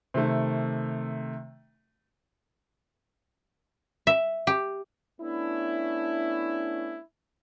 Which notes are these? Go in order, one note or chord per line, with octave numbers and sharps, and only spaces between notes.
C3 D#3 A3
E5
G4
A3 B3 C#4 D4 E4